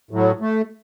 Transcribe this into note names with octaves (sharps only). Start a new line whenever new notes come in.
A2 F#3
A3